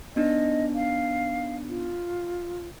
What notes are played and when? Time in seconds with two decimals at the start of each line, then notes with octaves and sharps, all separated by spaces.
0.16 B3 D4 D#4 D#5
0.75 F5
1.69 F4